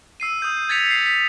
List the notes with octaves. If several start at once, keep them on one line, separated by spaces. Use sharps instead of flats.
E6 C7 D#7
D#6 G6
G#6 A6 B6 C#7 F7
C7
B6